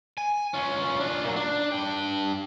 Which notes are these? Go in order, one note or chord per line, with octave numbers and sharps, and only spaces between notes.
G#5
C#4 F4
D4 F4
A#2 F#3
D4
D4 G5